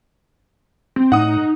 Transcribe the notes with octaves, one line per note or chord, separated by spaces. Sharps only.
C4
A2 D#4 F#5 D#6